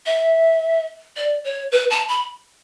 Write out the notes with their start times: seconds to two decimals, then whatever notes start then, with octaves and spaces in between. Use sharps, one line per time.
0.06 E5
1.16 D5
1.44 C#5
1.72 B4
1.90 A5
2.08 B5